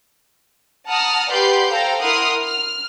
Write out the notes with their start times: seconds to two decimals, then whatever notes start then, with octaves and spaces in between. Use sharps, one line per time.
0.88 F#5 A5 A#5 D#6 F6
1.29 G4 B4 D5 F#5 C6 G6
1.70 A4 C5 F5 G5 A#5
2.01 E4 A#4 F#5 C6 D#6 F6
2.44 F6